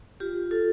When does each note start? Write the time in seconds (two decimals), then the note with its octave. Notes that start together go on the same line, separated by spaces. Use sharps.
0.20 F4 G4
0.51 F4 A4